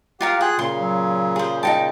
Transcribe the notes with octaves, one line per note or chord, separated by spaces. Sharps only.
F4 G4 A#4 F5 F#5
F4 G#4 G5 F#6
A#2 C#3 C6
F#3
G#4 C5
D#4 F#4 G5 A5